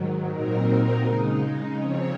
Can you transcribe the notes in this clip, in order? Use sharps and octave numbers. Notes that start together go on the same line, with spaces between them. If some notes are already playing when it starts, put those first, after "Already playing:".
Already playing: G#2 D#3 F#3
A#2 F#3 C4 D#4 A#4
C#3 G#3 D#4
C#3 F3 C4 C#5